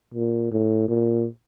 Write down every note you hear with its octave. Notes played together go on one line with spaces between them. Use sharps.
A#2
A2
A#2